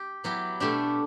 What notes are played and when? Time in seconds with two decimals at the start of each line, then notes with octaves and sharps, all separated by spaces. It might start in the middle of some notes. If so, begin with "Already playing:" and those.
Already playing: G4
0.24 F#3 B3 E4 G4
0.60 B2 A3 D4 G4